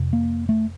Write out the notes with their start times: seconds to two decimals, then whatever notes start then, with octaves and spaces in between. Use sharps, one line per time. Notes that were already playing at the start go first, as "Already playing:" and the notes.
Already playing: F2 C3
0.13 A#3
0.49 A3